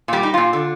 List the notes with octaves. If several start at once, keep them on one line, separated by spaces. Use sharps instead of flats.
A#2 G3 G4
D#4
A#2 F4
D3